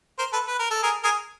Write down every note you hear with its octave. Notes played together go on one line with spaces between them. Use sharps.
A#4 C5
A4 B4
B4
A#4
A4
G#4 A#4
G#4 A#4